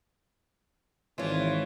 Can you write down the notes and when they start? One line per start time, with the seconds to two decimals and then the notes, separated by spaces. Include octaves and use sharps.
1.18 G#1 E3 F4 C#5